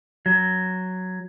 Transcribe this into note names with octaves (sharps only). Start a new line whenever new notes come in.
F#3